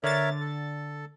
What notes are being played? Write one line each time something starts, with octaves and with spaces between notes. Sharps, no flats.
D3 A#4 C#5 E5 A6
A4